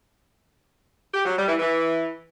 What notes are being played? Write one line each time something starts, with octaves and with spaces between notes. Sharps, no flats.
G4
F#3
G3
E3
E3